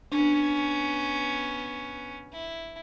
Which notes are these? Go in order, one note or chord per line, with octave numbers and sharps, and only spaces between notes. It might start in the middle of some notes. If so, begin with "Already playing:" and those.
B3 C#4 D4
E4